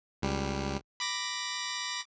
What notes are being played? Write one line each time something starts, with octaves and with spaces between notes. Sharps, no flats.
C#2 G3
B5 D6 A#6